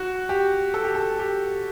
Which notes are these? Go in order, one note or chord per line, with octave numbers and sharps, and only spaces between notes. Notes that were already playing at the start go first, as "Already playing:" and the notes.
Already playing: F#4
G4
A4
G4
A4
G4